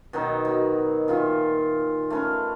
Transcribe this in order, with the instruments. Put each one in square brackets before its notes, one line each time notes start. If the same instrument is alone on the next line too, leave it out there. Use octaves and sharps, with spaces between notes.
[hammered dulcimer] B2 D#3 F#3 D#4
F#3
A#2 D#3 F4 E5
A3 C#4 B4